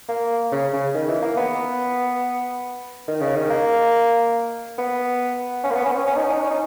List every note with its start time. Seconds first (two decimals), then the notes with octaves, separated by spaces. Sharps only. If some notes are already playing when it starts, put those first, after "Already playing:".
0.09 A#3
0.52 C#3
0.73 C#3
0.94 D#3
1.08 E3
1.22 A#3
1.37 B3
3.08 D#3
3.21 C#3
3.36 D#3
3.50 A#3
4.78 B3
5.64 C#4
5.71 A#3
5.75 B3
5.86 C#4
5.92 B3
5.96 C#4
6.07 C#4
6.16 D#4
6.24 C#4
6.33 D#4
6.41 C#4
6.51 D#4